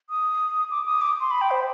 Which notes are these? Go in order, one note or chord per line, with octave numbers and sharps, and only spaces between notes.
D#6
D6
D#6
D6
C6
B5
G5
C5